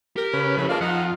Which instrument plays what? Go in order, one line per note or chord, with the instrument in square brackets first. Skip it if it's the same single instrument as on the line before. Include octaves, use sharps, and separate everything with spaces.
[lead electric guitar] G4 [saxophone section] A#4
[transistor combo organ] C#3 B4
[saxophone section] A2 [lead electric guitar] F3 G4
[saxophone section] E3 G#3 A#3 [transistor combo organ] F4 [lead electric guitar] D5 A5
[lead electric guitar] F2 [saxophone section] D#4 F#5